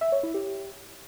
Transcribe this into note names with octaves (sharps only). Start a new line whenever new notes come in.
E5
C#5
E4
G4